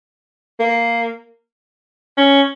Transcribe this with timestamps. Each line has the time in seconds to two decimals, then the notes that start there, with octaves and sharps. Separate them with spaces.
0.59 A#3
2.17 C#4